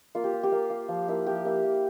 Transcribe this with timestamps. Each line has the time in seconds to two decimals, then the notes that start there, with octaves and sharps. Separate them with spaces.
0.15 A#3 F4
0.24 G4
0.33 F4
0.43 G4
0.52 A#3
0.70 F4
0.88 F3
1.08 A#3 E4
1.26 F3 G4
1.45 A#3 E4
1.64 A#3